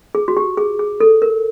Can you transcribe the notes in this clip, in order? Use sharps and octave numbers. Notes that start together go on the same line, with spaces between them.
G#4
F#4
G4
G#4
G#4
A4
A#4